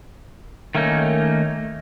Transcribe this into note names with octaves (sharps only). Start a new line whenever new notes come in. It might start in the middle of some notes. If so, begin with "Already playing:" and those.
D#3 A3 A#3 C#4 D#4